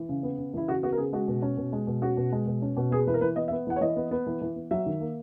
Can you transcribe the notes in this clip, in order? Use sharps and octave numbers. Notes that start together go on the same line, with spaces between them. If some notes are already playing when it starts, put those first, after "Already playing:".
Already playing: E3
C#3
B3
C#3
E3 E4
C#3 F#4
B3 F#4
A#4
C#3 G#4
G#3 F#4
B2
C#4
B2
G#3
B2
C#4 F#4
B2
G#3
B2
C#4
B2
B3 G#4
E3 B4
A#4
E3 B4
B3 D#5
E5
B3
E3 F#5
C#5
E3 D#5
B3
B3
E3
E3
B3
F#3 E5
D#3
A#3